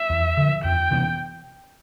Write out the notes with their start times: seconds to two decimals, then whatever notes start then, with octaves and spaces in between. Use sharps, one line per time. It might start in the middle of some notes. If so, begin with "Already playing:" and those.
Already playing: E5
0.10 E2
0.37 D3 F3
0.64 F2 G5
0.91 C3 E3 B3